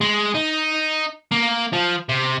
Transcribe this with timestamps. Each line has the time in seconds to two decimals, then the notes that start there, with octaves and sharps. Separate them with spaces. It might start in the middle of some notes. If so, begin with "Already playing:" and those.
0.01 G#3
0.35 D#4
1.31 A#3
1.73 F3
2.09 C3